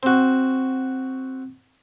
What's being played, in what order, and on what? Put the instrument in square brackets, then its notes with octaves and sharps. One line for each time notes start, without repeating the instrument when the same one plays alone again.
[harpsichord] C4 F#4